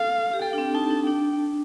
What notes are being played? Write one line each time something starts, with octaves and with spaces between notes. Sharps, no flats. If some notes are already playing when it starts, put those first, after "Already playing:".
Already playing: A4 F5
G4
A4 G5
D4
C4
D#4 A5
D4
D4 G5